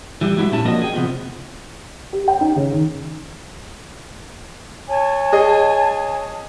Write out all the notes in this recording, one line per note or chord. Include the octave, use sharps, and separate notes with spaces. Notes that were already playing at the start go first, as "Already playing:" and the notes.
E3 G3
F#3 G#3 E4 G4 E5
A#2 C#4 E4 A5
F3 A#3 C#4 D4 F#4 D#5
G#4 G5
C3 F3 B3 C4 F4
G4
G5
D#4
C#3
D#3
C#5 G#5 A5
G#4 D#5